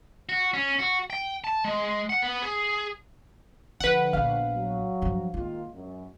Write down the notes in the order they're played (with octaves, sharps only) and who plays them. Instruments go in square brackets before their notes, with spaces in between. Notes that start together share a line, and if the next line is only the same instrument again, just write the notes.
[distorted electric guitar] F#4
C#4
F#4
G5
A5
G#3
F#5
B3
G#4
[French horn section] D3 [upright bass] F3 [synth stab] B4 F#5
[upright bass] A#1 B3 [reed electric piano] F5
[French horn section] F#3
[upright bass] G2 F3
[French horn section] D#3 A#3 F4 [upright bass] G#3
[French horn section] F#2